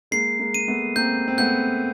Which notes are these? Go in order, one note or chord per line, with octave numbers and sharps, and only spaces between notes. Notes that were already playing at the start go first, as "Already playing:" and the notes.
G#3 A#3 C7
G#3 A#3
D#7
A3 B3
A#3 C4 G6
C4
A3 B3 G6